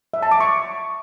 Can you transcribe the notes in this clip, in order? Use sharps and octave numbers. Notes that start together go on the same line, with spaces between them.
E5
A5
D6
C#6